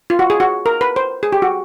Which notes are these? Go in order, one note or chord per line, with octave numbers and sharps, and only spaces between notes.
F4
F#4
G#4
F#4
A#4
B4
C5
G#4
G4
F#4